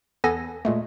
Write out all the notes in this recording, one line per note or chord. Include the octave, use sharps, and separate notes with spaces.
E2 B3 A4 G#5 A#6
A#2 G#3 A3